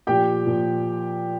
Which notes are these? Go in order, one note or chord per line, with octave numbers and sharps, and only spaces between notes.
A#2 F3 G4 G5
A#2 F3